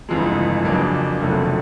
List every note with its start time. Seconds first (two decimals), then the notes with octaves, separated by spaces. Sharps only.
0.09 G1 F2 C#3 E3 G#3
0.65 F2 C#3 F#3 A#3 D4
1.20 F1 F2 D3 F#3 A3